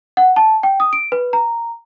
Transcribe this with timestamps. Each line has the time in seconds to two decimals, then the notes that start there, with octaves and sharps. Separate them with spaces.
0.17 F#5
0.36 A5
0.63 G5
0.80 D#6
0.93 D7
1.12 B4
1.33 A#5